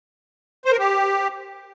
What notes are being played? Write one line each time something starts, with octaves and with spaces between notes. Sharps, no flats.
C5
A#4
G4